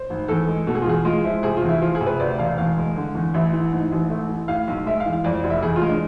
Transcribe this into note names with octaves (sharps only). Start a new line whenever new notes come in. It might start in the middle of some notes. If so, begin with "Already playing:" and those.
Already playing: C5
G#1
E2 A4
G#3
B2 A4
G#4
F4
E2 G#4
G#3 F4
F3 E4
C3 G#4
F4
E2
E4
F3 F4
G#4
C3
B4
D2 D5
E1 F5
E2 F5
G#3
D3
E2
A1 E5
E3
G#2
A1
A3
E3
A2 F5
B1
G#3 E5
F5
E3
F5
F2 D5
F1
E5
E2 G#4
F4
G#3
D4